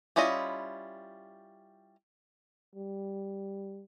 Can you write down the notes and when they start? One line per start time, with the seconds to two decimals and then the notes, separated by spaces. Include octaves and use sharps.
0.16 G3 C#4 E4 F4 D#5
2.75 G3